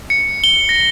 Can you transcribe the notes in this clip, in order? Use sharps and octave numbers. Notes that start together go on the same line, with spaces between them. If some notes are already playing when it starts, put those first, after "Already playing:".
C#7
G7
A#6